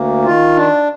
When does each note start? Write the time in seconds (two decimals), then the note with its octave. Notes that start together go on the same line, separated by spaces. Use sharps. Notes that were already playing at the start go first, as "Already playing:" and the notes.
Already playing: D2 A#3
0.24 D#3 F4
0.56 D4